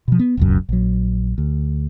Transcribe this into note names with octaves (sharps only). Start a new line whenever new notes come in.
B2 F3
B3
E1 C#2 F#2
A#1 F#3
D2